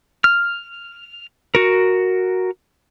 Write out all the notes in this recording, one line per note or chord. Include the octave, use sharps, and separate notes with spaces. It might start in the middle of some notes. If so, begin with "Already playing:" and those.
F6
F#4 A#4